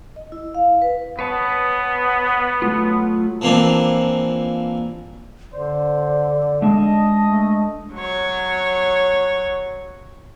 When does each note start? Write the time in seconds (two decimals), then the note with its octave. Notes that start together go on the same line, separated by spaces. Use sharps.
0.16 D#5
0.32 E4
0.55 F5
0.82 B4
1.19 B3 B4 C#5 A5
2.62 F#3 A3 F4
3.41 E3 F3 A#3 C4 D4
5.53 D3 C5 D5
6.62 G#3 D4 D#5 E5 A5
7.25 A3
7.94 F#3 C#5